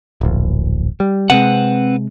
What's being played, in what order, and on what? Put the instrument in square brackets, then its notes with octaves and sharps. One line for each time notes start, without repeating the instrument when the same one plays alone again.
[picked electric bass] D1 A#1
G3
[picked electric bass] C3 G#3 [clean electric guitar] C4 B4 F#5